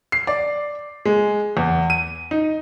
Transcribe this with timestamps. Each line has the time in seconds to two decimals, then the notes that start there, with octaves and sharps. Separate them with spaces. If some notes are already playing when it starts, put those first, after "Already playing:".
0.12 C7
0.27 D5
1.05 G#3
1.57 E2
1.90 D#7
2.31 D#4